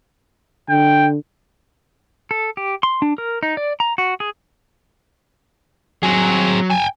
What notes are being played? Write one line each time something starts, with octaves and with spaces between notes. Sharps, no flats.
D3 G5
A4
G4
C6
D4
A#4
D#4
D5
A#5
F#4
G#4
F#3 C4 G#4
G5 G#5